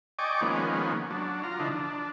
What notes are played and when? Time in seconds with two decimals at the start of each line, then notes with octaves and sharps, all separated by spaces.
0.19 D5 D#5 G5 G#5 C#6 D6
0.41 D#3 F3 G#3 A#3 B3 C#4
1.11 F#3 D4
1.43 F4 A#5
1.59 D3 E3 F3 D4 D#4
1.71 D4